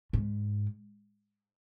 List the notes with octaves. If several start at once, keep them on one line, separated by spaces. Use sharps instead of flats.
G#2